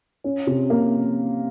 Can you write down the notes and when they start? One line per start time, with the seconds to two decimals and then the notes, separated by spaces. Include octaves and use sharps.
0.24 C#4
0.47 C3
0.70 A#3